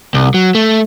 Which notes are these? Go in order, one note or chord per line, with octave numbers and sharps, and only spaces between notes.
C2
F#3
A3